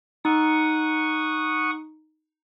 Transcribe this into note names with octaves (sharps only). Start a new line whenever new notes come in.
D#4 F#5 C#6 D#6